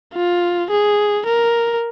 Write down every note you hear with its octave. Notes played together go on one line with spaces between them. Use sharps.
F4
G#4
A#4